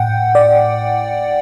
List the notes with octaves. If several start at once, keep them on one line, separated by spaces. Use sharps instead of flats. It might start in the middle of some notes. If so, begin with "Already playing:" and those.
Already playing: A2 F#5 G5
D5